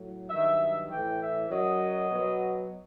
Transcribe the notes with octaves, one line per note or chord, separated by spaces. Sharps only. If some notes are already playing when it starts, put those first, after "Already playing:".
Already playing: A2 F#3
G2 D#3 F#3 E5
A2 E3 G5
E5
F#2 F#3 D#5
B2 F#3